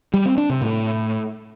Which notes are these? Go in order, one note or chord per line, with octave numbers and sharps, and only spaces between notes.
G3
C4
D4
C3
A2